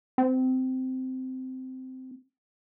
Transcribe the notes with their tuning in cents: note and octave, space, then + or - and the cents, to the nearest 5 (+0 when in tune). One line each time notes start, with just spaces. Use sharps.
C4 -15